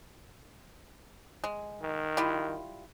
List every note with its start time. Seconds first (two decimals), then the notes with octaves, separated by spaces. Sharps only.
1.44 G#3
1.81 D#3
2.17 G3 E4 F4